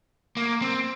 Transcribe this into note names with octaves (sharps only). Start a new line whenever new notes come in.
A#3
C4